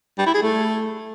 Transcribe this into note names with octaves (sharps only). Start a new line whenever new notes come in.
G3
E4
G#4
A3